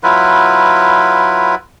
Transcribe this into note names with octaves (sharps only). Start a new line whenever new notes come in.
F#3 E4 F4 B4